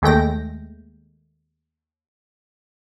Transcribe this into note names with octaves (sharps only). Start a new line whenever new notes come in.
D#2 G#3 A3 G5 A#6